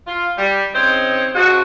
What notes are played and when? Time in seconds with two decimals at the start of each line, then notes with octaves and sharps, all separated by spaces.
0.07 F4
0.38 G3
0.74 C#3 C4 D#4 C5 C#5
1.35 C#3 F3 G#3 F#4